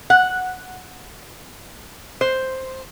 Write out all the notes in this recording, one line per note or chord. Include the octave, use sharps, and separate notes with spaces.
F#5
C5